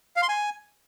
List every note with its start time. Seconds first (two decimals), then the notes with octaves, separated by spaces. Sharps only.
0.16 F5
0.23 C6
0.29 G#5